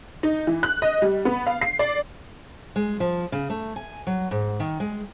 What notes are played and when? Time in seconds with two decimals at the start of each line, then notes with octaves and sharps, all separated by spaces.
0.23 D#4
0.47 E3
0.63 F#6
0.82 D#5
1.02 G3
1.25 B3
1.47 F5
1.61 C7
1.79 D5
2.76 G#3
3.00 F3
3.32 C#3
3.50 A3
3.76 G#5
4.07 F#3
4.31 G#2
4.60 D#3
4.80 G#3